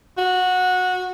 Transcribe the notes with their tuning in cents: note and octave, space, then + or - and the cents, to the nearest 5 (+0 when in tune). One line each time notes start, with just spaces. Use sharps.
F#4 -15